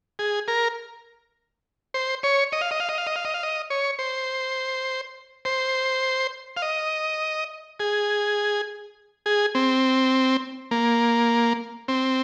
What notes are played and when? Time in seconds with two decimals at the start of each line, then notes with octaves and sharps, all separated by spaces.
0.19 G#4
0.48 A#4
1.94 C5
2.23 C#5
2.52 D#5
2.61 F5
2.71 D#5
2.80 F5
2.89 D#5
2.98 F5
3.07 D#5
3.16 F5
3.25 D#5
3.34 F5
3.43 D#5
3.70 C#5
3.99 C5
5.45 C5
6.57 F5
6.62 D#5
7.80 G#4
9.26 G#4
9.55 C4
10.71 A#3
11.88 C4